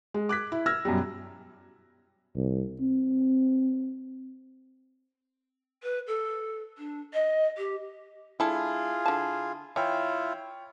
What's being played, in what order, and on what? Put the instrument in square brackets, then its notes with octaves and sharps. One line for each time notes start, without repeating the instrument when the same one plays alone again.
[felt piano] G#3
D6 F#6 G#6 B6
E4
E6 F6 G#6 A#6
F#2 B2 F#3 G3
[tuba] C2
C4
[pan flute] B4
A4
D4
D#5
G4
[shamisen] G#3 D4 A4 [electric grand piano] E4 [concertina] F4 G#4
[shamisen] D3 A5
[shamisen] E3 [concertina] E4 F4 [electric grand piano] C#5 G5